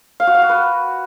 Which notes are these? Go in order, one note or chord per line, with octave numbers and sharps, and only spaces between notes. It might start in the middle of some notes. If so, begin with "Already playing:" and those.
F5
F#4
F5
F#4
B4